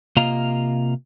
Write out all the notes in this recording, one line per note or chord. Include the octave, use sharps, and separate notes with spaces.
C3 A#3 F4 D#5 F5 A#5